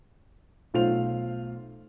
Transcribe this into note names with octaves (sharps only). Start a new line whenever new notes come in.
B1 A3 F4 C5 F7